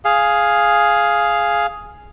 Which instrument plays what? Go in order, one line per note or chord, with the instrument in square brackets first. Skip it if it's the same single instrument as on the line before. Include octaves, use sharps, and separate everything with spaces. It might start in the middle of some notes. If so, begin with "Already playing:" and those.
[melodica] G#4 F5